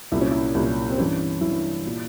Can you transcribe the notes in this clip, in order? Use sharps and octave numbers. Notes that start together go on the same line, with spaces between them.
C2 A#2 E4
C#4
E4
C2 A#2
C4
G2 E3 C#4
G2 E3 E4
A#2